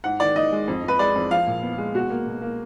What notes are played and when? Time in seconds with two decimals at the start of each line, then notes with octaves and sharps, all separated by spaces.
0.04 G#2 F#5
0.20 D#3 D5
0.36 D#3 D#5
0.52 G#3
0.68 F2
0.84 F2 B4
0.99 G#3 D5
1.16 F2
1.31 F3 F5
1.47 A#2
1.63 B3
1.78 G#3
1.94 B2 F#4
2.10 A#3
2.26 B2
2.42 A#3